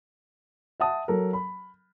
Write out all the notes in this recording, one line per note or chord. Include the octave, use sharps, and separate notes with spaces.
E5 F#5 A5 D#6
F#3 A4 A#4
B5